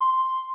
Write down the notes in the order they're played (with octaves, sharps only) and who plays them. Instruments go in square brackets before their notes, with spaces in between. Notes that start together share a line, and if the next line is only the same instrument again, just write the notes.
[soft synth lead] C6